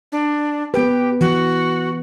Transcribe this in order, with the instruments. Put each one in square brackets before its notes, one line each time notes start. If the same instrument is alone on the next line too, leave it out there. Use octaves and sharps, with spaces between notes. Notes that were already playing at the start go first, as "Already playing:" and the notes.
[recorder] D4
[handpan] B3 B4 [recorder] G4
[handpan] E3 [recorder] F#4